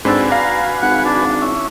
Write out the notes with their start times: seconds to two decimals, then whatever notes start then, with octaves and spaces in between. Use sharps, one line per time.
0.05 G#2 C4 D4 F#4 A4 B4 G#5
0.30 D5 F5 A#5
0.82 G#1 F#5
1.05 D4
1.42 C#4 E4